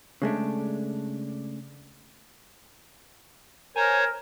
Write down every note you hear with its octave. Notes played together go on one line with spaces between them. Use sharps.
C#3 G#3 A3 D4
A#4 C5 C#5 G#5